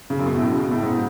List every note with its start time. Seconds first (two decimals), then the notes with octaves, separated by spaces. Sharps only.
0.10 C#3
0.19 F#2
0.26 B2
0.35 A2
0.43 B2
0.52 C#3
0.60 B2
0.71 A2
0.82 G#2